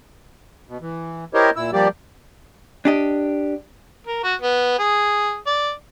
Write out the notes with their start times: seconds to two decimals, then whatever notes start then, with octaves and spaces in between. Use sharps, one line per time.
0.69 B2
0.81 E3
1.34 E4 G4 A#4 C5 C#5 D#5
1.56 A#2 E4 E6
1.73 F3 G3 A#3 G4 D5
2.85 D4 G4 D#5
4.07 A#4
4.24 F#4
4.42 B3
4.79 G#4
5.47 D5